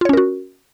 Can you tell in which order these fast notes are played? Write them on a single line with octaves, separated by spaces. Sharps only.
F4 C#5 C#4 A#4 F#4